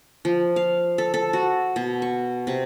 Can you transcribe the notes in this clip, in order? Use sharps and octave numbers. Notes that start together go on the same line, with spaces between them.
F3
F5
A4
A4
F#4
B2
C#6
C3